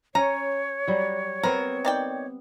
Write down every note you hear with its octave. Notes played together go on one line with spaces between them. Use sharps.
C#4 C#5 A#5
F#3 G3
B3 C4 A#4
D#3 D5 G5